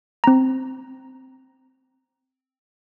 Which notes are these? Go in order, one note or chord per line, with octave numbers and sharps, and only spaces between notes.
C4 A#5